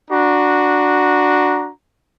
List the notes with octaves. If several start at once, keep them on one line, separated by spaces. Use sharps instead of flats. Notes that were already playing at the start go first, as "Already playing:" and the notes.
D4 F#4 A#5